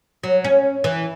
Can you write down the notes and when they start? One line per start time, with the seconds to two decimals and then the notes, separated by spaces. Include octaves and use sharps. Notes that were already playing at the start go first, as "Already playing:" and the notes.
0.24 F#3
0.44 C#4
0.84 E3